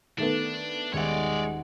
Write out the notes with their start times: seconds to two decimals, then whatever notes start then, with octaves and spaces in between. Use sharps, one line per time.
0.18 D#3 A3 B3 D4
0.93 D#1 G#3 C#5 D5 E5 F#5